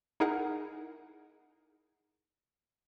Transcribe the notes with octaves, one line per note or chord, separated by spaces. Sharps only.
D#4 E4 G#4 A#4 F#5